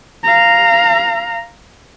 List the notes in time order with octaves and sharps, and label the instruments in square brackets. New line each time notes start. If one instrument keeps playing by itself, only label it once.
[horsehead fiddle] F5 A#5